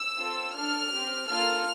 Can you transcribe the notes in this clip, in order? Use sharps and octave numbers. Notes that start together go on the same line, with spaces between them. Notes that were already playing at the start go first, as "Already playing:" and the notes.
Already playing: E6
C4 F4 A4
D4 A4 F6
C4 G4
A#3 F4 A4 F6